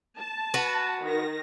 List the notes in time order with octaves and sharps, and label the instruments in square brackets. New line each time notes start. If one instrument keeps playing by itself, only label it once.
[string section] A5
[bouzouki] F#4 B4
[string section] D#3 A#6